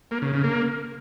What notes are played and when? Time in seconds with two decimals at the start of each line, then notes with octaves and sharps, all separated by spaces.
0.11 A#3
0.22 C#3
0.33 C#3
0.44 A#3